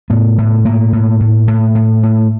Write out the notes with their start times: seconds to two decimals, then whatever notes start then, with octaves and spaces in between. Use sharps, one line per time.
0.10 A2 B3
0.38 A2
0.65 A2 A#3
0.93 A2
1.20 A2
1.48 A2
1.75 A2
2.03 A2